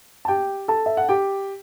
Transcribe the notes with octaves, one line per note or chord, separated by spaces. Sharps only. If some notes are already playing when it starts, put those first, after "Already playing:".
A5
G4 G5
A4 A5
E5
F#5
G4 G5